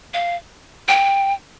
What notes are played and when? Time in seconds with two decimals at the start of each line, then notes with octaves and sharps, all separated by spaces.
0.14 F5
0.88 G5